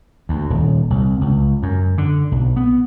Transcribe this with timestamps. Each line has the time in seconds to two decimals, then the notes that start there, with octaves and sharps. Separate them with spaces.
0.29 D2
0.50 D#1
0.90 C2
1.21 C#2
1.63 F#2
1.98 D3
2.32 B1
2.56 B3